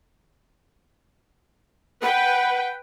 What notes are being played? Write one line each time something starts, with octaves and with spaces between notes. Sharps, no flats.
B4 F#5 G5